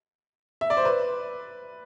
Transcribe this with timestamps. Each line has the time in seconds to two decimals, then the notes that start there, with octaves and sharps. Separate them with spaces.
0.61 E5
0.70 D5
0.77 C5
0.85 B4